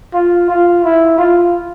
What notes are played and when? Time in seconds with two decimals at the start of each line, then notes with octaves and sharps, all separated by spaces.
0.14 F4
0.50 F4
0.84 E4
1.18 F4